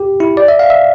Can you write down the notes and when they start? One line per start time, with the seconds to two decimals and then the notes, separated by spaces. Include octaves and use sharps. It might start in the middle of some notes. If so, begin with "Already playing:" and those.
Already playing: G4
0.20 E4
0.37 D5
0.48 E5
0.59 F5
0.70 E5